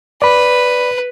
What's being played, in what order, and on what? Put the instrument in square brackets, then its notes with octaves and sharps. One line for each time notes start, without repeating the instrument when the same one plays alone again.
[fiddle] B4 [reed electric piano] D5 B5